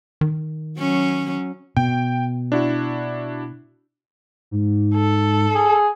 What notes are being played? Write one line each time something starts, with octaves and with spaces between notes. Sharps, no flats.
D#3
F#3 C#4
B2 G5
D4 E4 F#4
G#2
A4
G#4